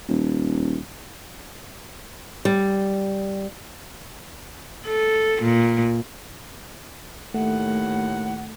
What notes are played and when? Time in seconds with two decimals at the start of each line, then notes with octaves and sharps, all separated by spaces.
0.09 D#1
2.45 G3
4.86 A4
5.42 A#2
7.34 D#2 A2 A3 F#5